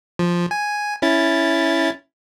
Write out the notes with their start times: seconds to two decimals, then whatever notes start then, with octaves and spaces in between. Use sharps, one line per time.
0.19 F3
0.51 G#5
1.02 C#4 E4 A6